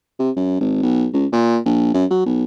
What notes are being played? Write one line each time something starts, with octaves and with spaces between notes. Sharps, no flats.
C3
F#2
G#1
B1
C#2
A#2
A#1
F#2
F#3
B1